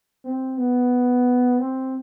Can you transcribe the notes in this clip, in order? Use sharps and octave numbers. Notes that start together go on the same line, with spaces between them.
C4
B3
C4